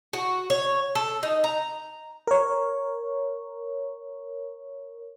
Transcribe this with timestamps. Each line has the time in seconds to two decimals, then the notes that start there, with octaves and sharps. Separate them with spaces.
0.13 F#4
0.50 C#5
0.95 A4
1.23 D#4
1.44 A#5
2.27 A#4 C#5